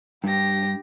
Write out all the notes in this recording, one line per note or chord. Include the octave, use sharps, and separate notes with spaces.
G2 G4 A#6